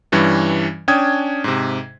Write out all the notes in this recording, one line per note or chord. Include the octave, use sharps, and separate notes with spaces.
G2 E3 G3 C#4
C#4 D4 G5 D#6 G#6
G#2 C3